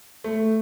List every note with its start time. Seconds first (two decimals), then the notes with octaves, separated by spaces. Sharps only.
0.24 A3